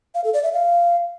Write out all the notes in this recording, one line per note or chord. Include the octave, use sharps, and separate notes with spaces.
F5
A4
D5
E5
F5